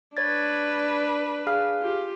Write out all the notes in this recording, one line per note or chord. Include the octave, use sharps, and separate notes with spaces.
D4 B4 C#5 G#6 A6
G#4 F5 F6
F4 G4